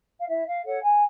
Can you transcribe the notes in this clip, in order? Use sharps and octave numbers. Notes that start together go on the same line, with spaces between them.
F5
E4 E5
F5
A4 C#5 F#5
G#5